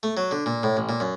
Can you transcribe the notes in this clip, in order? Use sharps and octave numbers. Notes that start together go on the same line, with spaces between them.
A3
F#3
D3
A#2
A2
A1
A#2
F#2